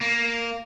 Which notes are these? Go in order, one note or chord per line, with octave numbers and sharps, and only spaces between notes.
A#3